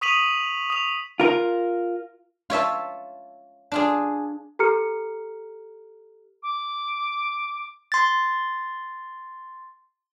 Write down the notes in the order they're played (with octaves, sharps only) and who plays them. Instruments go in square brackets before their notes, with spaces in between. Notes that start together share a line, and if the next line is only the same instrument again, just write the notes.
[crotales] C#6 D#6 B6 D#7 F7 F#7
D#6 F7
[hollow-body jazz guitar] F4 A#4
[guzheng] F4 C#5 E5 A5
D4 F4 G#4
[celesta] G4 A4 A#5 F6 C#7
[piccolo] D6
[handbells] C6 A6